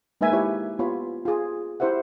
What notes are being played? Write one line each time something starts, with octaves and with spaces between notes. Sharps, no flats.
G#3 A#3 D#4 B4 E5 G#5
E4 G4 C#5
B3 F4 G4 C#5 B5
F4 G#4
E4 G4 C5 E5 F#5